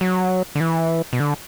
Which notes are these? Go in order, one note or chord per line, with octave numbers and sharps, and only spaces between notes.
F#3
D3
E3
B2
D3